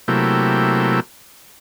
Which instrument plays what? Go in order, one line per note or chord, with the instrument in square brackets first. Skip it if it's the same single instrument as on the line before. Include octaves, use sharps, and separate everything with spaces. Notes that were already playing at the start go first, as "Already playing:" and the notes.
[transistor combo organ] C3 F#3 A3 A#3 E4 G4